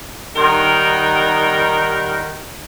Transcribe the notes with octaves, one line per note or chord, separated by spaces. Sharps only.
D#3 G3 D#4 A#4 F#5 G5